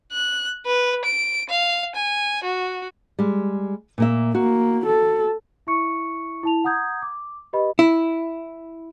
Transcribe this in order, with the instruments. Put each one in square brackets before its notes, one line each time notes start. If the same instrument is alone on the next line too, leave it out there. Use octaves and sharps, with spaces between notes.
[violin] F#6
B4
D7
F5
G#5
F#4
[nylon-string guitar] G3 G#3
A#2 A#3 E5
[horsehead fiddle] A#3 [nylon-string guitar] F#4
[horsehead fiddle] A4
[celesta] E4 E5 C#6 C#7
E4 A5 F7
F#5 A#5 D#6 G6 G#6
D6
G4 B4 D#5 B5
[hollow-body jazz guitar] E4